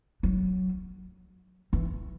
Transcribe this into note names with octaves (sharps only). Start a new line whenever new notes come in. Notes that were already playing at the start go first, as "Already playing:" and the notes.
F#3
E3